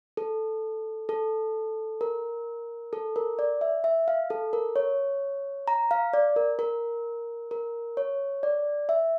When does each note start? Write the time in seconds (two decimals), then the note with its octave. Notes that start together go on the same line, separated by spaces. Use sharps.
0.17 A4
1.09 A4
2.01 A#4
2.93 A4
3.16 A#4
3.39 D5
3.61 E5
3.84 E5
4.08 F5
4.30 A4
4.53 A#4
4.76 C#5
5.68 A#5
5.91 F5
6.13 D5
6.36 A#4
6.59 A#4
7.51 A#4
7.97 C#5
8.43 D5
8.89 E5